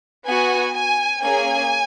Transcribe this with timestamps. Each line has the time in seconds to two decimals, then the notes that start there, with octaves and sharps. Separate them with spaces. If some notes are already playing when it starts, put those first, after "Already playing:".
0.26 B3 F#4 G#5
0.75 G#5
1.23 A#3 C#4 G#4 G#5